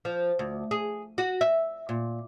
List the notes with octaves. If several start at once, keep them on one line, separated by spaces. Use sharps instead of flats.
F3
D2
G#4
F#4
E5
A#2